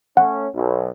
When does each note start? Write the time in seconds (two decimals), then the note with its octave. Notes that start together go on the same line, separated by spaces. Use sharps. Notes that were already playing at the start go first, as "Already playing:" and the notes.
0.17 A3 C#4 F#5
0.55 B1